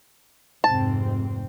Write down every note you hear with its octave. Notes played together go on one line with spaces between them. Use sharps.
F1 G#2 C4 A5